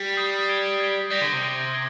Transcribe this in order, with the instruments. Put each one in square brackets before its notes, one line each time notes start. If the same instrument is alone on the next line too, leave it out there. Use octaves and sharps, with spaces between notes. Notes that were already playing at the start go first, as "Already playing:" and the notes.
Already playing: [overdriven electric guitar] G3
[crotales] D#6 G6 C7
G#6 D7 G7
G#6 D7 G7
[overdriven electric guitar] G3 [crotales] G6 A#6 D7
[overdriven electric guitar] D3
C3
[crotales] G6 A#6 D7
G#6 D7 G7